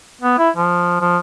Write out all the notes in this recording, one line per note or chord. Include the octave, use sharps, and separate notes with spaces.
B3
E4
F3
F3